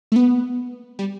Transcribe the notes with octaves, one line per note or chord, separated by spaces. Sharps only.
A3
B3
G3